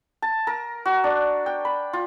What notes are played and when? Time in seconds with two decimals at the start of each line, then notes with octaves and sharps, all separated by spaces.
0.22 A5
0.47 A#4
0.85 F#4
1.04 D4
1.46 G5
1.65 B5
1.93 F4